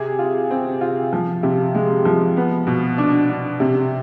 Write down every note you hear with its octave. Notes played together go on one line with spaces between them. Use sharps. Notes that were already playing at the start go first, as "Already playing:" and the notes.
Already playing: C3 G#4
F4
C4
F4
F3
C3
G#3
F3
B3
B2
D4
D4
C3